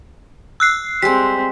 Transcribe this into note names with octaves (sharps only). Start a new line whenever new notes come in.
E6 F#6 C7
G3 G#3 C4 C5 B6